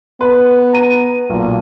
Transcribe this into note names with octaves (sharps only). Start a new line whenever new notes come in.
B3 B4
A#5 D#7
B1 A#2